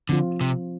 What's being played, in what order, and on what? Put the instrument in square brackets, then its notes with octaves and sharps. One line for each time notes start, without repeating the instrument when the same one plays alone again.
[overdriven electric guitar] D3 [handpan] F3 C4 F4
[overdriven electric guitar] C3